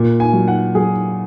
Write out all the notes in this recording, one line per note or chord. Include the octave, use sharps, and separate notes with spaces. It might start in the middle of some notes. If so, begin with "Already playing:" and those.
Already playing: A#2
G#5
F#3
F#5
F#3 G#4